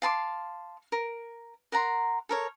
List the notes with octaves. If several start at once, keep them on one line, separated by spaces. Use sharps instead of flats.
F5 A5 C6 D6
A#4
A#4 F#5 A#5 C6
A4 A#4 C#5